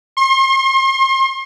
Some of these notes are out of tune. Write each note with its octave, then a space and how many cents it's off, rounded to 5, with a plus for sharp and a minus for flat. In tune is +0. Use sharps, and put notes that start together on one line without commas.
C6 +40